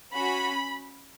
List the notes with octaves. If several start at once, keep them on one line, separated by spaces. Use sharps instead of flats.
C#4 F#4 B5